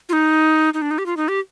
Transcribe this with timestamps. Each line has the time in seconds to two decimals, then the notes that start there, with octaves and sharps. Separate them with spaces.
0.09 F4
0.13 D#4
0.74 D#4
0.82 D4
0.91 D#4
0.98 G4
1.06 F4
1.17 D#4
1.28 G4